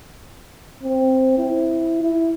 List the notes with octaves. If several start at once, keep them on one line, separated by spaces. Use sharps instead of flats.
C4
E4
E4